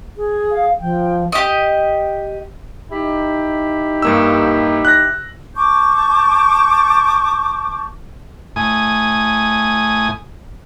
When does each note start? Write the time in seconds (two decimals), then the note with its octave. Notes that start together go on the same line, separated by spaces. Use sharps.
0.17 G#4
0.52 F5
0.80 F3 G5
1.32 G4 D#5
2.90 D#4 E4 G4
4.02 G2 A#3 E6
4.85 F#6 A#6
5.55 A5 C#6 D6 G6
8.56 A2 G#5 D#6